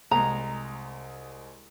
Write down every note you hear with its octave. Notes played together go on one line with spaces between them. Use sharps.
C2 G#3 A#5